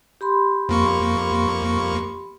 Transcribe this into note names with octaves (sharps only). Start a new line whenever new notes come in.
G4 B5 C6
F2 A#3 C#6